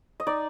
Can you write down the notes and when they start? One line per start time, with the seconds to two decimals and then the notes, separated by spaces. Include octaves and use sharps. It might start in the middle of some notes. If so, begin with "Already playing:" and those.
0.20 D#5
0.27 D#4 D5